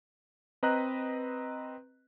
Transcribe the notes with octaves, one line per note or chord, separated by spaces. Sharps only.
C4 B4 D#5 A#5 F#6